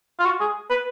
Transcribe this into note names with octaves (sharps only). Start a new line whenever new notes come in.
F4
F#4
G#4
B4